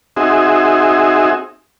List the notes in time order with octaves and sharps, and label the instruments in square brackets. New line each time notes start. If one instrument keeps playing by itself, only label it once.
[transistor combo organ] C4 D#4 F#4 G#4 E5